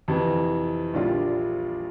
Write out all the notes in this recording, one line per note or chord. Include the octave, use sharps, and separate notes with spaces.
F2 C3 E3
A#1 A#2 G3 D4 F4